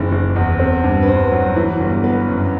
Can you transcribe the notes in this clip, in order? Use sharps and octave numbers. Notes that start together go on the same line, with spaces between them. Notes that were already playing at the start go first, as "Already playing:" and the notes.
Already playing: F#1 D#3 E3 C5
F#1
E2
C4
G2
B4
G2 C5
F#3
E3
G1
B3 B4
F#2